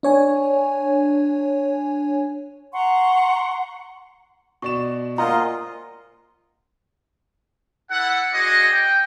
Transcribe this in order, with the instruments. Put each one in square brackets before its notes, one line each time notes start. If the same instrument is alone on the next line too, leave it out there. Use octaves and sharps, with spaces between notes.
[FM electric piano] D4 C#5 G#5
[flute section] F#5 A#5 C6 C#6
[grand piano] B2 D5 E7 [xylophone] C#6
[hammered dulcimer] A#2 C5 [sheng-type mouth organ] F4 D#5 [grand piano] F#5 [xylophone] A#5
[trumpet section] E4 A4 F#5
F#4 G#4 C5 D5 D#5
G5